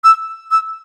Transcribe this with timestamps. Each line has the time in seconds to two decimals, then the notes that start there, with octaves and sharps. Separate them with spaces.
0.04 E6
0.51 E6